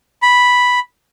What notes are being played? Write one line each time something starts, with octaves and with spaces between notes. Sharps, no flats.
B5